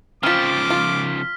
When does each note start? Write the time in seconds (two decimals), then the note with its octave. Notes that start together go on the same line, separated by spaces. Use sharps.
0.23 C#3 F3 C4 F4 D6 F6 B6
0.70 F4